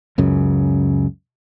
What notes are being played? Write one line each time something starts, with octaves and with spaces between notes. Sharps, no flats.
C#2 F#2 C#3